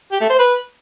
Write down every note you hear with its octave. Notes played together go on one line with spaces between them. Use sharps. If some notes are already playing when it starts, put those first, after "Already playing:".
G4
A3
C5
B4